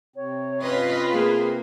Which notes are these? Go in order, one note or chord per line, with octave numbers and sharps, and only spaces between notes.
C3 C4 C#5
C#4 F4 B4 D#5
A#3 G#4